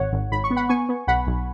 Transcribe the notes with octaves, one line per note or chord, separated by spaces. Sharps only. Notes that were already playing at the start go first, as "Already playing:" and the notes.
Already playing: G#1 C#5 F#5
G#1
G#1 B5
C#6
B3
F#5 B5
B3 G#5 C#6
B3
B1 F#5 B5
B1